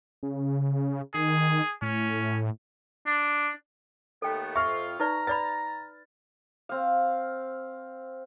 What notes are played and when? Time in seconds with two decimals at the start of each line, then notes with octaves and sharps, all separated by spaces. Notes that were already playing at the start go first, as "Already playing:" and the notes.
0.23 C#3
1.14 D#3 G#4
1.82 A2 C#4
3.07 D4
4.22 D#2 A3 B3 A4 G5
4.56 F2 F4 E5 C#6 F6
5.00 D#4 B4 D5 A#5
5.27 B4 D5 B5 A6
6.69 C4 F5